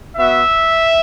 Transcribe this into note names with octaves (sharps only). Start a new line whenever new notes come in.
B3 F#4 E5